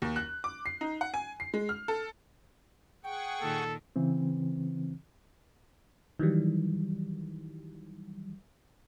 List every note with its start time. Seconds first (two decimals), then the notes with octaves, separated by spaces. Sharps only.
0.02 D#2
0.16 F#6
0.44 D6
0.66 C7
0.81 D#4
1.01 F#5
1.14 G#5
1.40 C7
1.54 G#3
1.69 F6
1.88 A4
3.04 G#4 F#5 G5 C#6
3.41 A#2 D#3 A4
3.96 C#3 E3 C4
6.19 D#3 E3 F#3 G3